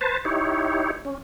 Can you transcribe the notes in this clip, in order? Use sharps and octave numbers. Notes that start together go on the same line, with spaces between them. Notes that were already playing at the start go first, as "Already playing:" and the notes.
B4 C5 A5
D#4 E4 G4 C#5
C#4